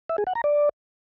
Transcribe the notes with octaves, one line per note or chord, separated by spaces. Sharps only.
E5
G#4
F#5
A#5
D5